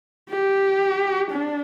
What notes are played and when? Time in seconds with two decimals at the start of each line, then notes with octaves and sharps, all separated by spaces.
0.30 G4
1.31 D4